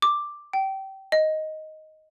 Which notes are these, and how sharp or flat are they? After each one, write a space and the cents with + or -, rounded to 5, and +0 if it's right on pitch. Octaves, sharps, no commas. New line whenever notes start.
D6 +5
G5 -25
D#5 +5